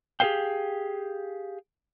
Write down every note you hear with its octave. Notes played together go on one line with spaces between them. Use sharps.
G4 G#4 A#4 C5 F5 G5